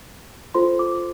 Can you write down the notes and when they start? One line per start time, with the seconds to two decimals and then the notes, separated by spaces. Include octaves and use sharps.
0.54 F4 A4 C5 C6
0.79 D6